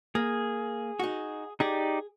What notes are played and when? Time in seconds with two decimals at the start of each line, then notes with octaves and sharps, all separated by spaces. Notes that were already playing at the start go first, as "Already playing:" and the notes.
0.15 A#3 G#4
1.00 D#4 F#4
1.60 D#4 G4 G#4 D5